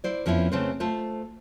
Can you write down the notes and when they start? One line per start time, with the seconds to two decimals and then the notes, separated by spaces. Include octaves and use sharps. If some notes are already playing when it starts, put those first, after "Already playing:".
0.04 E4 C5 D5
0.26 F2 F3 B3 C#4 E4
0.52 C#3 A3 C4 B4 C5
0.80 A3 F4 C5